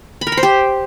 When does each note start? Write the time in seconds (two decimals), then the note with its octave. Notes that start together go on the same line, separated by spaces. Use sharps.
0.21 B5
0.27 A#4
0.32 B5
0.37 C5
0.43 G4